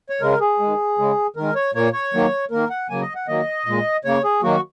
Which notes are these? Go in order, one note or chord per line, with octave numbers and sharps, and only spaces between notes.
C#5
C#3 G#3 A#4
G#4
G#3
D#3
C#3 G#3
D#3 G#3 A#4
C#5
A#2 A#3 C#5
C#5
D#3 F#3 A#3
D#3 A#3 A#4
F#5
C#3 F#3 A#3 G#5
D#5
F#5
D#3 F#3 A#3 D#5
A#2 G#3
C#3 A#3 C#5
G#4
D#3 F#3 A#3 F#4